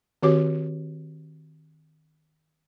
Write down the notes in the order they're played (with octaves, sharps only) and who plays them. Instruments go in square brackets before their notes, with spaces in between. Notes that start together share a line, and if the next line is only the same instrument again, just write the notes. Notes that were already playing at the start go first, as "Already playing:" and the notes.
[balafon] D#3 C4 F#4 G4 C#5 D6